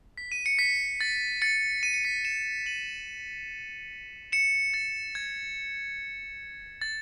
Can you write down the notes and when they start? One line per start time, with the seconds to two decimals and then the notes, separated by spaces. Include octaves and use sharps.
0.18 B6
0.32 D#7
0.46 C#7
0.59 B6
1.01 A6
1.42 A6 C#7
1.83 D#7
1.94 C#7
2.04 B6 D#7
2.25 C#7 E7
2.66 D#7 F#7
4.32 C#7 E7
4.74 A6
5.15 G#6
6.81 A6